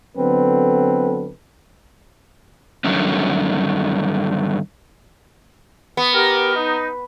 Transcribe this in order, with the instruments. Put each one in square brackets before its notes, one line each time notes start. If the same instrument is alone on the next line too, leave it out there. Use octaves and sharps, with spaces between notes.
[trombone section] D3 F#3 B3 C4 A4 B4
[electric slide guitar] G2 A#2 D3 D#3 F#3 C#4
[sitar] B3
[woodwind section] G4 A#4
D#4